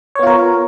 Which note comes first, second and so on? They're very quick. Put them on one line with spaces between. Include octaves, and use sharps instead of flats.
C#5 B3 F4 A#4